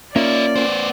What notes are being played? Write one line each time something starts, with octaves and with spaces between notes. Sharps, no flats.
A#3 C#4 D#4 F4 D5 E5
B3 C5